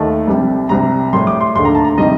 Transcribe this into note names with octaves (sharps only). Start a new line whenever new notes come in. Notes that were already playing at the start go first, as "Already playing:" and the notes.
Already playing: D#2 D#3 A3 A5
C2 C3 G3
C2 C3 G3 A#5
A2 G3 C6
D6
C6
D#2 D3 A3 C6
A#5
A5
A#5
C3 D#3 G3 D#5